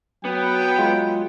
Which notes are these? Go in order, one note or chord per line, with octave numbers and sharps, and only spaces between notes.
F#3 B3 G5
G#3 F4